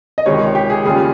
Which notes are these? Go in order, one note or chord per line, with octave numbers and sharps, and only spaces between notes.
D#5
C#2 C3 D#3 C#5
G4
G#4
D#2 C#3 G3 C#4 F4 G#4